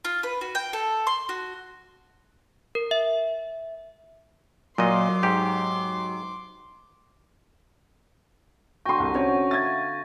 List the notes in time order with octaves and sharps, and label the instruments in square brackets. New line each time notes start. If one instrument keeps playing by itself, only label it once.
[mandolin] F4
B4
F#4
G5
A4
C6
F#4
[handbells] A#4
E5
[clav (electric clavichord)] A#2 D#5 [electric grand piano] F#3 [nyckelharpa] C6 D6
[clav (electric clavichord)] G#2 G4
[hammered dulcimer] D3 F#4 [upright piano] G5 C6 [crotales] C#6 G6 A#6
[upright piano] C2
[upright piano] C4 C#4 C#5 [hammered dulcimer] F#5 D6
[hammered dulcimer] E5 F5 [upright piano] G#6 A6